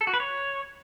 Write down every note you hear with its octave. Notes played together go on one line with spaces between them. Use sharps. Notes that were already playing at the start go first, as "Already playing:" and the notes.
A4
F#4
B4
C#5